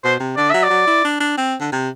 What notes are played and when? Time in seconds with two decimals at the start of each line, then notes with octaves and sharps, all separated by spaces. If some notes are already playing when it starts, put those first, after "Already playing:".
0.04 B2 C5
0.20 C3
0.37 D3 D5
0.50 F#3 E5
0.63 D5
0.70 F#3
0.87 E4
1.05 D4
1.20 D4
1.37 C4
1.60 D3
1.72 C3